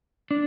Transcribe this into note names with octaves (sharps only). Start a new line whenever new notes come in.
D4